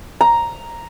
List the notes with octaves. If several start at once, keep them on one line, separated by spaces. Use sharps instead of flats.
A#5